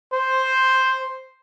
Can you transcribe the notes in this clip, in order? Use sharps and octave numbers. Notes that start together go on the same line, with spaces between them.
C5